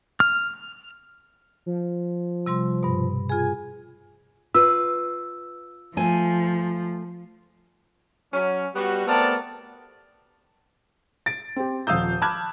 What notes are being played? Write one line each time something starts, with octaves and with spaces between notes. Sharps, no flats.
F6
F3
C3 G3 C6
G2 B2
F4 G#4 G#5
F4 B4 E6
F3 A3 G#5
F#3 C#4
G3 B3 F#4
A3 B3 C4 A#4 D5 A5
A6 D7
C4 G4
D#1 F3 F5 D#6 E6 G6
A5 B5 D6 F6 F#6 G#6